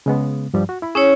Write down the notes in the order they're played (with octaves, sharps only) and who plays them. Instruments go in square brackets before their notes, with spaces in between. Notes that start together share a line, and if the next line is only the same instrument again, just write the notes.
[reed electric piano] C#3 G#3 B3
G2 F3 G3
F#4
E4 B5
[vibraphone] C#4 E4 C#5 [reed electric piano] G#4